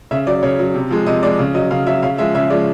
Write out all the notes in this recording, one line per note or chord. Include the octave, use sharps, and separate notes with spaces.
C#3 E5
F#3 D5
C#3 C#5
F#3
C3
F3 G#3
C3 D#5
F3 G#3 D5
C#3
F#3 D#5
C#3 F5
F#3 E5
C#3 F5
F3 G#3 E5
C#3 E5
F3 G#3 D5